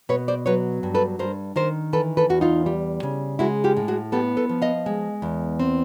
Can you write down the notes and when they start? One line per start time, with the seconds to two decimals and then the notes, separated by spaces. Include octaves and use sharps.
0.09 B2 B4 C#5
0.28 C5 D5
0.46 F#3 B4 C#5
0.83 G2
0.94 A4 B4
1.19 G2 A#4 C5
1.56 D#3 A#4 C5
1.93 E3 A4 B4
2.17 A4 B4
2.30 E2 F#4
2.41 D#4 F4
2.66 G3
3.03 C#3
3.39 G#3 E4 F#4
3.64 F4 G4
3.77 A2
3.88 F#4 G#4
4.12 B3 G4 A4
4.37 A4 B4
4.49 F3
4.62 D#5 F5
4.86 G#3
5.22 E2
5.60 C4